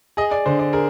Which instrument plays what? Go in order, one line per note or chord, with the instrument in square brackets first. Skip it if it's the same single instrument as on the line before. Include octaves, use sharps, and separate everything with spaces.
[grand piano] G#4 [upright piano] D#5
[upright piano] D5
[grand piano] D3 [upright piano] C5
[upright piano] D5
[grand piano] G#4 [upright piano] A#4